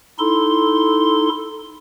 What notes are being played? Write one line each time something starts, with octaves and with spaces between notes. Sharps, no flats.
D#4 E4 A4 C6